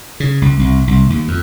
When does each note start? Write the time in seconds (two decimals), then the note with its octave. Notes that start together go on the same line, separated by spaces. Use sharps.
0.20 C#3
0.42 C#2
0.59 C2
0.87 C2
1.10 D#2
1.28 F2